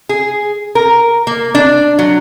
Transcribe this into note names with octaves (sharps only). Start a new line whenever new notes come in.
G#4
A#4
A#3
D4
F#3